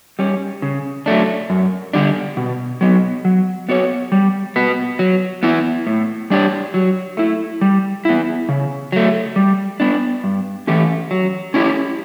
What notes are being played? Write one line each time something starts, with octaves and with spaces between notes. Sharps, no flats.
G3 C#4
C#3
F#3 A3 D4
F#2
D3 G3 D4
B2
F#3 B3
F#3
B3 F#4 C#5
G3
B3 F#4 B4
F#3
B3 E4
A2
G3 D4 G4 C#5
F#3
A3 E4
G3
B3 E4
C#3
F#3 A3
G3
B3 D4
G2
E3 A3 C#4 G4
F#3
C#4 E4 G4